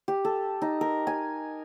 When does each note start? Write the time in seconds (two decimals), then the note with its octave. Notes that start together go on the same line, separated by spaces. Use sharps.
0.08 G4
0.25 A4
0.62 D#4
0.81 A#4
1.07 G#5